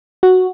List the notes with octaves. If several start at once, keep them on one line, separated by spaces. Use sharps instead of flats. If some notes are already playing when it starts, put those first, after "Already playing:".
F#4